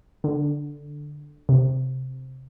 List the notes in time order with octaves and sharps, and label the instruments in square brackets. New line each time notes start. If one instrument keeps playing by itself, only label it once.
[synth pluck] D3
C3